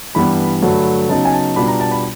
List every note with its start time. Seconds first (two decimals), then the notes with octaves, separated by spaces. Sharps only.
0.15 G2 E3 G3 B3 D4 B5
0.62 G2 D3 F#3 A3
1.09 C#3 F#3 B3 D#4 A5
1.25 G#5
1.33 A5
1.56 B2 G3 B3 D4 F4 B5
1.68 A#5
1.80 A5
1.92 B5